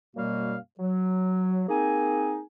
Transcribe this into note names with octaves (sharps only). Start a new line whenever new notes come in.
F#2 B2 G3 A#3 F#4 F5
F#3
A#3 C4 D#4 G#4 G#5